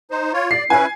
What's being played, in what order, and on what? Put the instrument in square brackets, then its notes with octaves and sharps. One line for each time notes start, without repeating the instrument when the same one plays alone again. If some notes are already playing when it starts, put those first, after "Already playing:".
[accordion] D#4 C5
F4 C#5
[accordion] D5 [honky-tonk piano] C7
[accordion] C#4 E4 B4 [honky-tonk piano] G#5